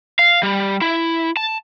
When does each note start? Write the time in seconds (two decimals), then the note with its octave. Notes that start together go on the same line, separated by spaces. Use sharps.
0.19 F5
0.43 G3
0.82 E4
1.37 A5